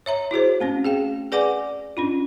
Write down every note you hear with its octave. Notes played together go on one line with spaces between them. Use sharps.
C#5 E5 A#5
E4 F#4 G#4 C5
A3 C4 C#4
G#4 F5 G5
G#4 B4 D5 F#5 G#5 D6
C#4 D4 F4